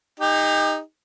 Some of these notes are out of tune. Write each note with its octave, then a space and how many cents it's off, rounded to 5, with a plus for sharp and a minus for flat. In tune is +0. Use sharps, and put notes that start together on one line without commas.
D#4 +0 G4 +40